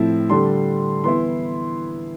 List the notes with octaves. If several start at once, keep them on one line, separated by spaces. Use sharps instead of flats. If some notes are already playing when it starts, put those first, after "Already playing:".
Already playing: A2 F3 C4 E4
D3 G3 D4 C6
E3 B3 E4 C6